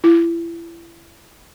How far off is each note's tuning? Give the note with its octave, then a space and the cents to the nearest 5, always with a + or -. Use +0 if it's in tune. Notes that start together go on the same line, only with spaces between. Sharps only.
E4 +30